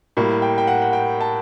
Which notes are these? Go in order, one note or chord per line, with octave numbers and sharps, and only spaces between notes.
A2 G3 A#3
G5
G5
F#5
F#5
G5
A5